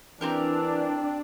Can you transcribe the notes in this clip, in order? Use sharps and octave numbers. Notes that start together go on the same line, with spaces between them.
E3 C4 D4 G4 A#4